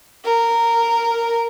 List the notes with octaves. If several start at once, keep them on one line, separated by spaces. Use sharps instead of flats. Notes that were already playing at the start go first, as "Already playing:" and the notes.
A#4